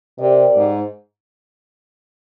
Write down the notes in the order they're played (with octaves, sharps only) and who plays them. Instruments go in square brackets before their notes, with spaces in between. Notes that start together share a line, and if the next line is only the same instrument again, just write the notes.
[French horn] C3 [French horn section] C4 G4 A#4 D5
[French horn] G#2